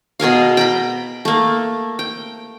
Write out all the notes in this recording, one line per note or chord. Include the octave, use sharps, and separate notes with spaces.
B2 G#4 A#4 F5
G5 A#5 B5
A3 A#3
G5